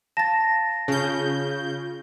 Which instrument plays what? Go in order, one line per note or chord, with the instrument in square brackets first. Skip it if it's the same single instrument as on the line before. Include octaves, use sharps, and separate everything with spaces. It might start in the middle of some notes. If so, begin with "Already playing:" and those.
[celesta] F5 A#6 [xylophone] A5 A6
[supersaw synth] C#3 G6 [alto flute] F4